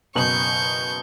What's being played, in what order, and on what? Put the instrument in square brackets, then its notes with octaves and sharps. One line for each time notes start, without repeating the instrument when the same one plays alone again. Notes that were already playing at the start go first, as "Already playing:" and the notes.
[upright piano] F#1 B2 F#7 [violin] C#6 G6